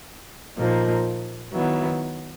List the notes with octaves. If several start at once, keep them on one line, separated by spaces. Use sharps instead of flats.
A#2 F3 A#3 D#4
D#3 F#3 B3 E4